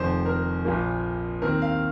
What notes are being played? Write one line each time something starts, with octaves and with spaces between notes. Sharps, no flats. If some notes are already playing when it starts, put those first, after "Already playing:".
Already playing: F1 F2 D#3 C5
A#4
A#1 A#2 F3 A#3
D#2 D#3 C4 A#4
F5